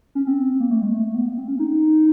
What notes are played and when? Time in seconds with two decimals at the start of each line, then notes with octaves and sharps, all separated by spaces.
0.15 C#4
0.27 C4
0.60 A#3
0.71 A3
0.82 G#3
0.93 A3
1.15 B3
1.26 A#3
1.37 C4
1.48 C#4
1.59 D#4